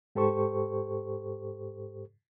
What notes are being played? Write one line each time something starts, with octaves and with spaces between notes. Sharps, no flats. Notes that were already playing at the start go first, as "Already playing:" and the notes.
G#2 G4 A4 C5 C#6